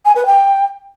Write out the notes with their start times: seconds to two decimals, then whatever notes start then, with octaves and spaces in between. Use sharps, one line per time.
0.05 G#5
0.16 B4
0.26 G5